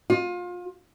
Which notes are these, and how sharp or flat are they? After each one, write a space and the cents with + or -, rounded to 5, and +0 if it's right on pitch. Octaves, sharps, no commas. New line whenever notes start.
F4 +30